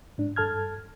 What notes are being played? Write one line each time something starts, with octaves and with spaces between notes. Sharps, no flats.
G#2 D4
G2 A4 A5 F6 G#6